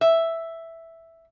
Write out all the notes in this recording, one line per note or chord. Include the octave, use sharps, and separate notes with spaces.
E5